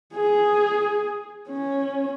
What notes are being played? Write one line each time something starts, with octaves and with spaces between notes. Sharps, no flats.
G#4
C#4